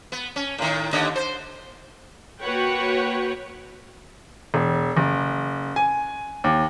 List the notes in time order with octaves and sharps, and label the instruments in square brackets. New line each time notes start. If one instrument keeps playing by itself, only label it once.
[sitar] B3
C#4
A2 D#3
D#2 D3 D#5
C5
[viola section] A#3 F#4 B4 C#5 F#5 G5
[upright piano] E1
F#1
G#5
D#2